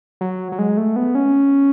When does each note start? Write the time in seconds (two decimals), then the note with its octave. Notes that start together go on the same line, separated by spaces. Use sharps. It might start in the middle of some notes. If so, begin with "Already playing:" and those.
0.21 F#3
0.52 F#3
0.59 G#3
0.77 A3
0.96 B3
1.15 C#4